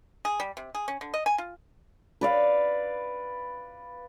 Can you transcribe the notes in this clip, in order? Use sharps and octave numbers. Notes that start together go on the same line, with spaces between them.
G#4
G3
C3
G#4
C#4
D3
D#5
G#5
F4
B4 D5 F5